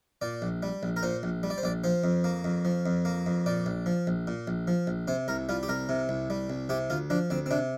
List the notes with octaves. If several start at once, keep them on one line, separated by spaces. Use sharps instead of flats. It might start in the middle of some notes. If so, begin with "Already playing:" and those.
A#2 D5
A#1
G3
A#1
A#4
A#2 C5
A#1
G3
D5
C5
A#1 D5
F3 C5
F2
A#3
F2
F3
F2
A#3
F2
A#2 D5
A#1
F3
A#1
A#2
A#1
F3
A#1
C3 C5
C2 A#4
G3 F4
G4
C2 A#4
C3
C2
G3
C2
C3 G4
D2 F4
F3 D4
D2 C4
C4
C3 D4